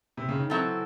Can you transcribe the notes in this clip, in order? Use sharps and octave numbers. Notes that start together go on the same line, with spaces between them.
C3
C#3
D#3
E3 F#3 C4 E4 A4